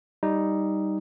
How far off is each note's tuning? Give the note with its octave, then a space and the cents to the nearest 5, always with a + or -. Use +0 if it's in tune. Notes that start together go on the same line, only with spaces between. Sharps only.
G3 +0 D#4 +5